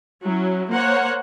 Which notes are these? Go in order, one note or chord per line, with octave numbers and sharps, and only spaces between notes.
F#3 C#4 E4
A#3 C5 C#5 F#5